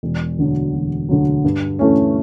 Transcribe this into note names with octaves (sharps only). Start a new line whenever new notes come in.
E1
D2 D3 F#3
E1
D2 D3 F#3
G2
E3 A3 C#4